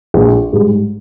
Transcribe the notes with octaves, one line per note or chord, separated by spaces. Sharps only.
A#1
G#2 G3